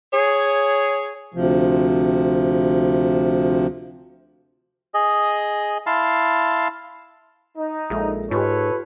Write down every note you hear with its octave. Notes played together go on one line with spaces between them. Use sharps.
G#4 C#5
D2 C3 F3
G#4 D#5
E4 F5 A5 C6
D#4
A#1 G#3 A4 E5
G#2 F4 G4 A4 B4 C#5